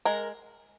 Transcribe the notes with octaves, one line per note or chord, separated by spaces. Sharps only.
G#3 A#4